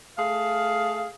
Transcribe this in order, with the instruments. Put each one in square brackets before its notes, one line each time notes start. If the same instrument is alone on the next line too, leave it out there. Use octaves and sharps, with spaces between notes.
[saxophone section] A3 G#4 F5